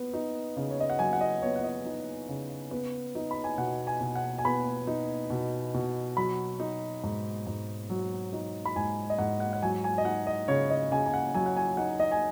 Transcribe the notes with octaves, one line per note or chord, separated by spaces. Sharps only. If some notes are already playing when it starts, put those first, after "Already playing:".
Already playing: B3
D#4
C#3
C#5
D#5
F#5
F#3 G#5
F#5
D#5
B3 C#5
F#5
D#5
D#4
C#3
B3
D#4
B5
G#5
B2 F#5
G#5
B2
F#5
G#5
B3 B5
D#4
B2
B2
F#3 B5
D#4
G#2
G#2
F#3
D#4
B5
G#2 G#5
D#5
G#2 F#5
F#5
F#5
F#3 G#5
G#5
D#5
D#4 F#5
D#5
C#3 C#5
D#5
C#3 G#5
G#5
F#5
F#3 G#5
F#5
G#5
D#4 F#5
D#5
G#5